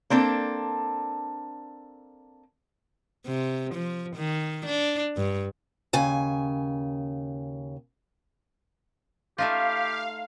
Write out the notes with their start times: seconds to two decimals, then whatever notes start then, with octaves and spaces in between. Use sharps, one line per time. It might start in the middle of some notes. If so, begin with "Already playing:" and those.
0.10 A#3 C4 D4 A4
3.26 C3
3.74 F3
4.16 D#3
4.66 D4
5.17 G2
5.93 D#2 C#3 G#5
9.38 A3 D#4 F4 G4 F5